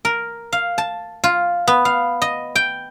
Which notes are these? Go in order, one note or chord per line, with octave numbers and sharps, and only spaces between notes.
A#4
F5
A5
F4
B3
F5
D#5
G5